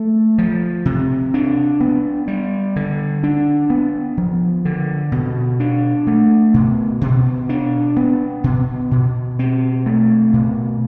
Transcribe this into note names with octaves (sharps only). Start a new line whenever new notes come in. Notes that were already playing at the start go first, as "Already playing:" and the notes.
Already playing: A3
F3
C3
D4
B3
G3
D3
D4
B3
F3
D3
B2
D4
A3
B2
B2
D4
B3
B2
B2
C4
A3
B2